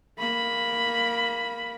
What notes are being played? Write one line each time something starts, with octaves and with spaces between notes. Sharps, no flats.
A#3 B5